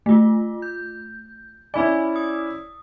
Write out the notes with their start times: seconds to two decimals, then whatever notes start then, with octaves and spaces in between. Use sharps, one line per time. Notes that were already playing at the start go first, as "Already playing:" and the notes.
0.06 A3 F4
0.62 G6
1.74 C#4 E4 D5 G#5 B5
2.16 D#6